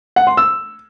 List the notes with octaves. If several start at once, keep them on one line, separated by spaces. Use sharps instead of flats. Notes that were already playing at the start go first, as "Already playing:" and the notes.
F#5
C6
E6